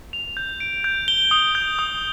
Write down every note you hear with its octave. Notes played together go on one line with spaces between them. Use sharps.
F7
G6
D7
G6
G7
D#6
G6
D#6